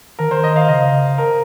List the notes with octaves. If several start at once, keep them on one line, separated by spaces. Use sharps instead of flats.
D#3 A#4
C5
D#5
F5
C#3 D#5
A#4